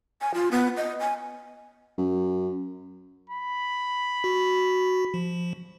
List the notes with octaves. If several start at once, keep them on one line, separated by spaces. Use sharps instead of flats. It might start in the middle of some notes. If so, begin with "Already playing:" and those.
G#5
F4
B3
D#5
G#5
F#2
B5
F#4
F3